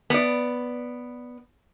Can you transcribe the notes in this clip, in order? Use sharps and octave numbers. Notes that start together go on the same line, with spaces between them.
B3 D5